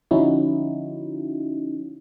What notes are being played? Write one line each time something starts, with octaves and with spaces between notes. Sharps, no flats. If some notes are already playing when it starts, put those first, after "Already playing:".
D3 F3 C#4 D#4 E4 F#4